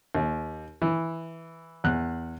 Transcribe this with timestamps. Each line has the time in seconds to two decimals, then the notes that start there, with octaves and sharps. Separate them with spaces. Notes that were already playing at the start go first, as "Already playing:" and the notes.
0.15 D#2
0.82 E3
1.84 E2 F#6